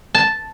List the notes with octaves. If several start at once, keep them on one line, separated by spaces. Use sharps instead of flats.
A5